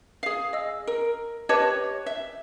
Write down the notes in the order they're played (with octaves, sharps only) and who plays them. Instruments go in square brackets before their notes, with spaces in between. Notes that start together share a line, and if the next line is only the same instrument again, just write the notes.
[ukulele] G#4 F5
[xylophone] D#5 E6
[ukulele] A#4
[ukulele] G4 B4 C#5 [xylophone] D#5 A5 D6
[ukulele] E5